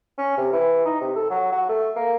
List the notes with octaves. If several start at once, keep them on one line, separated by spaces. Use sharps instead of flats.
C#4
C3
E3
D#4
C3
A4
F#3
F#4
A3
A#3